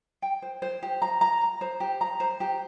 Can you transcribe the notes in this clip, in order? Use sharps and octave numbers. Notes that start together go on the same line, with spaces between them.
G5
C5
C5
G4
A#5
A#5
A#5
C5
G4
A#5
C5
G4